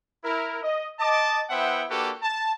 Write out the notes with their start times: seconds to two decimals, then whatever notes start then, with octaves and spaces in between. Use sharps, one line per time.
0.24 E4 A#4
0.63 D#5
0.99 D#5 A5 D6
1.50 B3 E4 C5 E5 F#5 G5
1.89 A#3 D4 F#4 G4 A4 B4
2.22 A5